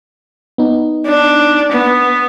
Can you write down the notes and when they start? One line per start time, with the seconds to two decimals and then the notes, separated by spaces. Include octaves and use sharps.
0.58 B3 D#4
1.07 D4
1.72 B3